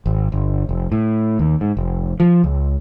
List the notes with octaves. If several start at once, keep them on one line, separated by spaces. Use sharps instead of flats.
G#1
G1
F1
A2
D#2
G#2
F1
F3
C#2